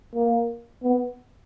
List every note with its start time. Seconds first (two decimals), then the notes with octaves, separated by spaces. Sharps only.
0.15 A#3
0.83 B3